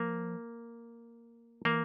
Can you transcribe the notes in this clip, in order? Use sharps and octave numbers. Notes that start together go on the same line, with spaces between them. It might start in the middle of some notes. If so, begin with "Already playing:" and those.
Already playing: F3 A#3
E3 A#3